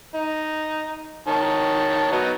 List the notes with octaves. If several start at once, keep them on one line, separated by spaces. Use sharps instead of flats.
D#4
D#3 C#5 A5
F#3 B3 D#4